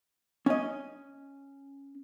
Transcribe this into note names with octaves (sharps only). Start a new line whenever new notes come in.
C#4 D#5